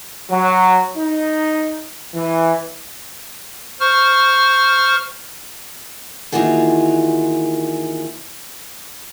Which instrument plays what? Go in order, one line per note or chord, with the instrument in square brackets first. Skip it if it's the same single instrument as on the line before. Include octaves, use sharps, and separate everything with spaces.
[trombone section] F#3
D#4
E3
[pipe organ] C5 C#6 F6
[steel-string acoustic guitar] D#3 E3 A#3 F4 F#4 G#4